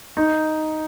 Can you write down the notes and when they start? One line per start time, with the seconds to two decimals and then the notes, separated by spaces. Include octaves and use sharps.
0.17 D#4